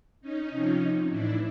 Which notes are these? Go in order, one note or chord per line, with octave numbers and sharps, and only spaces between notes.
C#4 D#4
C3 F3
A2 E3 D4 E4